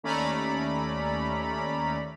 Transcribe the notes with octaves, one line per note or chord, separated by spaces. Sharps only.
D#2 A3 C#4 D5 A#5 B5